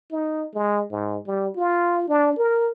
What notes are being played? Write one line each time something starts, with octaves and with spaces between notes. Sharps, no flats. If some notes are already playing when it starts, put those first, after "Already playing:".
D#4
G#3
G#2
G3
F4
D4
A#4